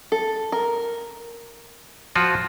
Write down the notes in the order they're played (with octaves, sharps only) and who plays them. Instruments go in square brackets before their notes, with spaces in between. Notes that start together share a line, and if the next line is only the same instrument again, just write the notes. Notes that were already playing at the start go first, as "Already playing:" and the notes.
[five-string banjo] A4
A#4
[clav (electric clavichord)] F3 F4 F#4